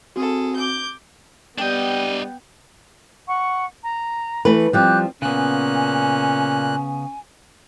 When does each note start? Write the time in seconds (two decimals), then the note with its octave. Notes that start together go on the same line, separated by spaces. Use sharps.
0.16 C4 F#4 G#4 A4
0.56 D6 G6
1.58 G3 B3 D4 D#5 G5
3.28 F#5 C#6
3.84 A#5
4.45 E3 A3 B4
4.73 F3 G3 C4 D6 F#6 G6
5.22 A#2 C#3 B3 C#4 G#5 F#6